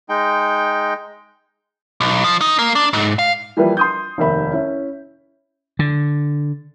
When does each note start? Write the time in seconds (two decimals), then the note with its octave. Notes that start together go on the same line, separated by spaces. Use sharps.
0.09 G#3 D#4 G5
2.01 B1
2.24 F3
2.41 D#4
2.59 A#3
2.75 D4
2.93 G#2
3.19 F5
3.57 E3 F3 G3 A#3 E4 B4
3.77 C6 D#6 G6
4.18 F1 D#2 A#4 E5 B5
4.52 C#4 E4
5.79 D3